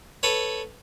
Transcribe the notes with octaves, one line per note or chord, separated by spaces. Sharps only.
A4 B4 C#5